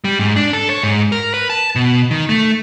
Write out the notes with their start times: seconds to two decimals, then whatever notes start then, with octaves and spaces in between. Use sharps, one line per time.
0.04 G3
0.19 G#2
0.36 D4
0.53 A4
0.70 C#5
0.83 G#2
1.12 A#4
1.34 B4
1.50 A5
1.76 B2
2.11 D#3
2.29 A3